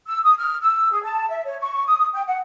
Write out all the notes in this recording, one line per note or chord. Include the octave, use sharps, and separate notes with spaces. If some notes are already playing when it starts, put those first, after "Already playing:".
E6
D#6
F6
E6
G#4
A5
E5
C#5
C#6
D#6
G5
F#5